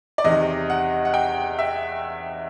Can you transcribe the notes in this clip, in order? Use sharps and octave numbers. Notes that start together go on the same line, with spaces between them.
D5
E2 C3 D#3 D#5
F#5
F#5
G5
E5